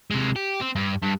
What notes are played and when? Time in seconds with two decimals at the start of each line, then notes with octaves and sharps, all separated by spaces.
0.11 C3 G#3
0.36 G4
0.61 C4
0.76 G2
1.02 G2